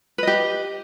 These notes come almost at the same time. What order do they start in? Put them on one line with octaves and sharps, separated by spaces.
B4 D#5 G4